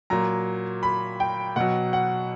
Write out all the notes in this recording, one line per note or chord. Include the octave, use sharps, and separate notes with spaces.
A#2 F#3 A#5
B5
G5
B2 F#3 F#5
F#5